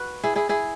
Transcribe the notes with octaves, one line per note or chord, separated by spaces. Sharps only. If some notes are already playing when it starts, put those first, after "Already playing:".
Already playing: F#4 B4
E4 G#4
E4 G#4
E4 G#4